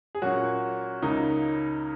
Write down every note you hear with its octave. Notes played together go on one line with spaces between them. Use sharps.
G#4
A#2 F#3 A#3 C#4 F#4
C#2 C#3 A#3 D#4